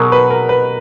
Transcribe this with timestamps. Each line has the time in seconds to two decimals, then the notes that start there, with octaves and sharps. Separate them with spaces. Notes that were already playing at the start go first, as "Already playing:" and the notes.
Already playing: B2 F#3 G#4 A#4
0.12 B4
0.30 A#4
0.49 B4